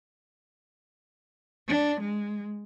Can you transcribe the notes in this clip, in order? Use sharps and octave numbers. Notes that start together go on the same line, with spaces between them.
D4
G#3